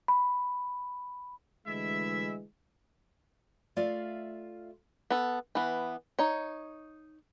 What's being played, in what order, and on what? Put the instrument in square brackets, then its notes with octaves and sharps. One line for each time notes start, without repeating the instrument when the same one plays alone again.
[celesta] B5
[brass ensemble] D2 E3 G#3 [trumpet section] E4 E5
[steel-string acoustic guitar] A3 F4 D5 E5 F5
[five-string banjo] B3 A4
E3 B3
D#4 C#5